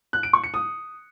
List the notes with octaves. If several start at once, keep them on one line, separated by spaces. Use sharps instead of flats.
F#6
D7
C#6
C#7
D#6